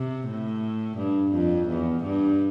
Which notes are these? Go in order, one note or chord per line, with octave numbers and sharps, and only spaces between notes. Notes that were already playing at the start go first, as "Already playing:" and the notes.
Already playing: C3
A2
G2
F2
E2
G2